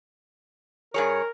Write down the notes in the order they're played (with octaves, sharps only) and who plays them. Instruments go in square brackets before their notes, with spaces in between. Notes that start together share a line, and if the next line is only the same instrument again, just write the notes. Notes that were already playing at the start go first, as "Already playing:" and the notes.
[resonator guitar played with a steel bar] G2 G#4 C#5 [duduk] A#4